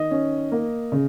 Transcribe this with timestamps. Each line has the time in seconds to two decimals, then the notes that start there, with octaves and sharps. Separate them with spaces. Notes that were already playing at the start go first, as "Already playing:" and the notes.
Already playing: D#3 D#5
0.11 C#4
0.52 A#3
0.92 C#3